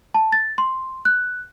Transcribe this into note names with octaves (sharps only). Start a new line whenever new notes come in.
A5
A6
C6
F#6